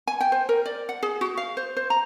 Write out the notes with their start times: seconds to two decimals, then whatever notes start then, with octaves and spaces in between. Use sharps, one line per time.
0.07 G#5
0.21 G5
0.32 C5
0.49 A#4
0.66 D5
0.89 F#5
1.03 G#4
1.21 F#4
1.37 F5
1.57 C5
1.77 C5
1.90 A#5